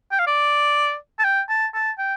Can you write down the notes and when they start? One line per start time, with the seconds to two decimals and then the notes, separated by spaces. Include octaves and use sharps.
0.12 G5
0.19 F5
0.27 D5
1.19 A5
1.24 G5
1.49 A5
1.74 A5
1.98 G5